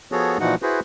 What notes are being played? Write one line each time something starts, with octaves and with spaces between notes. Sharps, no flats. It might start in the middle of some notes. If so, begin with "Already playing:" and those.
F3 B3 F#4 G#4 A4 C#5
A#2 E3 F3 D#4 F#4 F#5
E4 F#4 G#4 B4 C5